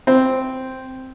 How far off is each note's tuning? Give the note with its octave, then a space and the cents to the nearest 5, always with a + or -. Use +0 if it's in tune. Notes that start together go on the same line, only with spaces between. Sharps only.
C4 -5